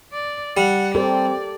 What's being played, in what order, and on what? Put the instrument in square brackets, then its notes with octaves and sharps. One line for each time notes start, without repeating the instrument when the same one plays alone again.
[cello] D5
[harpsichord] G3 [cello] F#5
[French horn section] C4 [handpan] G4 A4 A#4 [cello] D5